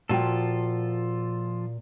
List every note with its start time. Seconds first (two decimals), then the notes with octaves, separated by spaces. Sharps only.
0.09 A#2 F3 F4 F#4 A4 G5